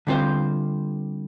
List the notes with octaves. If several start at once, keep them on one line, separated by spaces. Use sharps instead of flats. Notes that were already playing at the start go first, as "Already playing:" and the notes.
D3 G3 C4 F4 C5